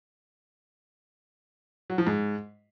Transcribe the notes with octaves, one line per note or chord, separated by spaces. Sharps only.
F#3
F3
G#2